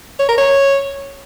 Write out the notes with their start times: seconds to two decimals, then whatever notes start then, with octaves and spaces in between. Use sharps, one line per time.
0.19 C#5
0.29 A#4
0.38 C#5